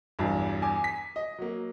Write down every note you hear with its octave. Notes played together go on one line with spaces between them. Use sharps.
B1 E2 G2
G#5 D6
B6
D#5
F#3 A#3